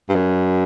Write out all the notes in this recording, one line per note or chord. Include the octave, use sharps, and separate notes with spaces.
G2
F#2